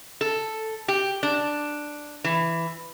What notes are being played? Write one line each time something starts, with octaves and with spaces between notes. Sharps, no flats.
A4
G4
D4
E3